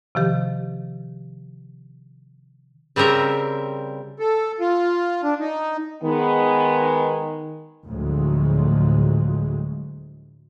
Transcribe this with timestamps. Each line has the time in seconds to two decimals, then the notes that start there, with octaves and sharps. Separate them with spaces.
0.15 C3 D#3 F3 G4
2.96 C#3 G3 C4 A#4 E5
4.19 A4
4.60 F4
5.23 D4
5.40 D#4
6.03 D#3 G#3 B3
7.84 D2 A2 F3 F#3 G#3